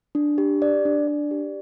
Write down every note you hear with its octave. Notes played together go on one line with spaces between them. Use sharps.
D4
G4
D5
D4
D5
G4